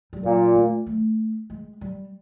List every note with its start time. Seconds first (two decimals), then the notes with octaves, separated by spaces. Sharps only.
0.13 G3
0.23 A#2 F#3
0.55 A3
0.87 A3
1.50 G#3
1.81 G3